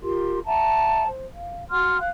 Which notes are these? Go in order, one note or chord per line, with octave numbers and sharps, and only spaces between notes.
F4 G4 A#4 C6
E5 F#5 A5 A#5
C5
F5
F#4 F#5 C6 F6
F5 F#6